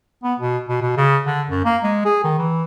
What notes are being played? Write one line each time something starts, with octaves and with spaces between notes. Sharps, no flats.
B3
B2
B2
B2
C#3
D3
F#2
A#3
G#3
G#4
D#3
E3